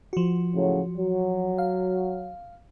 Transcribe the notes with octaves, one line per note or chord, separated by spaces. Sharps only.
F3 F#4
A2 C#3 F#3
F#3
F5